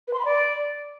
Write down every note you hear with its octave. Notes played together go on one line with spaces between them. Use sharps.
B4
C6
B5
D5